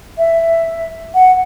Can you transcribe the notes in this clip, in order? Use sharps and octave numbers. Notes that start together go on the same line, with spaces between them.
E5
F#5